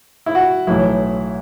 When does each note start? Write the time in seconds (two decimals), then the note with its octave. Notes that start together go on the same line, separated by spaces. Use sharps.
0.26 E4
0.35 F#4
0.67 B1 A2 E3 E4